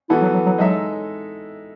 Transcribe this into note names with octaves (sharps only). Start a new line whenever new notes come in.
E3 B3 E4 F#4 A4
F#3
F#3
F#3
F#3 G#3 D#4 A4 E5